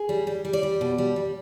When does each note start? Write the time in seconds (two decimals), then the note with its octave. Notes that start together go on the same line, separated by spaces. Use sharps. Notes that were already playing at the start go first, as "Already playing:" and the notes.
Already playing: G#4
0.09 G3
0.27 G3
0.45 G3
0.53 D5
0.63 G3
0.81 B2
0.98 G3
1.16 G3